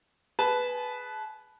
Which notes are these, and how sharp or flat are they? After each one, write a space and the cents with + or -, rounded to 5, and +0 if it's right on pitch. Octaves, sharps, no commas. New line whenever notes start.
G#4 +0 B4 +0 A5 -25